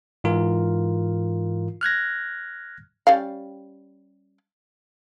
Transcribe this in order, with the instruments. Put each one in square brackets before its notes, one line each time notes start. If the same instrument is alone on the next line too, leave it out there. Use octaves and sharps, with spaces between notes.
[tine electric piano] G#2 E3 F4 A#4
F6 F#6 G#6 A#6
[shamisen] G3 C#4 F5